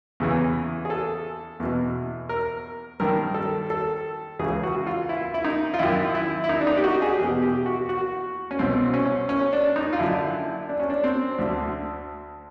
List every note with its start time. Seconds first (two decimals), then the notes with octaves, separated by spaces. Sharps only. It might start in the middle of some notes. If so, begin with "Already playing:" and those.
0.20 E2 C#3 E3
0.85 G#4
0.90 A4
1.60 E2 B2
2.29 A#4
3.00 G2 D#3 A#4
3.34 A4
3.70 A4
4.39 C#2 C#3 E3 G#4
4.63 F#4
4.86 F4
5.09 E4
5.34 E4
5.45 D#4
5.74 F4
5.79 F#2 D#3 E4
6.15 E4
6.44 E4
6.49 D#4
6.61 D4
6.67 D#4
6.77 G4
6.84 F#4
7.02 G#4
7.13 G4
7.19 E2 B2 G#4
7.42 G4
7.66 F#4
7.89 F#4
8.51 C#4
8.59 C2 B2 C4
8.94 C#4
9.29 C#4
9.53 D4
9.76 D#4
9.93 F4
9.98 F#2 D3 E4
10.69 D4
10.80 C#4
10.90 D4
11.04 C4
11.39 D2 D3